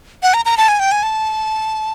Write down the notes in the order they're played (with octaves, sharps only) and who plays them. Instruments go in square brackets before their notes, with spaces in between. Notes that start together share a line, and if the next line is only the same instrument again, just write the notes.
[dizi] F#5
A#5
A#5
A5
G#5
G5
G#5
A5